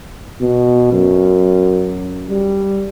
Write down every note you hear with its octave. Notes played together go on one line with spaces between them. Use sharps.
B2
F#2
G3